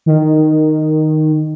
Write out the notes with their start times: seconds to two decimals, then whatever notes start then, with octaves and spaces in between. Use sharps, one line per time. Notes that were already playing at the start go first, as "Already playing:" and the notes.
0.06 D#3